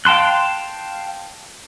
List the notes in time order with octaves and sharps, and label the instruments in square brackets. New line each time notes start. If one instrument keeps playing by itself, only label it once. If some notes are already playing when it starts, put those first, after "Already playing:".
[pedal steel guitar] F5 G5 A5 C6 F#6